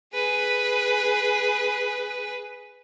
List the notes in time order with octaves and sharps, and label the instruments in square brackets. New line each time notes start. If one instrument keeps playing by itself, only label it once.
[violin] G#4 B4